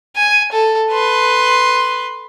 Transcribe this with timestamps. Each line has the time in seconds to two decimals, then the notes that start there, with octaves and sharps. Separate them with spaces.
0.16 G#5
0.52 A4
0.91 B4 C6